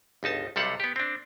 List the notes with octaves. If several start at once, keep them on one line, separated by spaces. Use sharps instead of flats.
G1 C#2 D#4 A5
B1 C3 G3 A4 F5 F#5
B3 G4
C4 D4